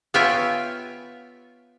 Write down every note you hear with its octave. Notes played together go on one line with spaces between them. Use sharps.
B3 F4 C#5 E5 G5 G#5